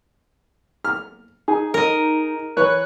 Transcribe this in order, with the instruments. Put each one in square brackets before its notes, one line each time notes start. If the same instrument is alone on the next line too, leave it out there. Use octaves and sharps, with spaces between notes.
[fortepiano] F6
[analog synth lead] D#4 [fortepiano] G#4
[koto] A#4 D#5
[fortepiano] E3 B4 C#5 [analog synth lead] F#6